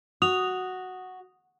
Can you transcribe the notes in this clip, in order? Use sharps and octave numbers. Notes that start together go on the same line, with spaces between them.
F#4 D#6 F7